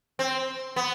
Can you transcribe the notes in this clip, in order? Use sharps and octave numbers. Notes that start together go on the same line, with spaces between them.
C4
B3